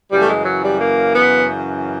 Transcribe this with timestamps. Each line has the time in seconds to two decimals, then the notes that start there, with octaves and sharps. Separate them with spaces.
0.11 F#2 C#3 E3 G3
0.20 A3
0.28 G#3
0.45 F#3
0.63 G3
0.80 A#3
1.14 B3